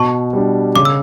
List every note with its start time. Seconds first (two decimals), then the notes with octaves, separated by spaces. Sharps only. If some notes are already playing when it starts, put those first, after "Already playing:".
Already playing: B2 A5 C#6
0.33 G3 D4
0.75 C#3 D6
0.85 E6